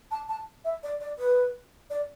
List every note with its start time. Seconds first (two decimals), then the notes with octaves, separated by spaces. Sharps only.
0.11 A5
0.29 A5
0.65 E5
0.83 D5
1.00 D5
1.19 B4
1.90 D5